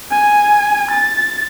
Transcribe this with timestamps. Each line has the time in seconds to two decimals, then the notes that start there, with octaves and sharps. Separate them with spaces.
0.11 G#5
0.92 A6